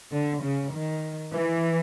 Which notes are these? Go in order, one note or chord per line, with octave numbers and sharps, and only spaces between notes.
D3
C#3
D#3
E3